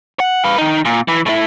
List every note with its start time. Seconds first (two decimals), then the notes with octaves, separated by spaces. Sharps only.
0.20 F#5
0.44 B4 F5
0.58 D#3 D#4
0.85 A#2
1.08 E3
1.26 A2 E4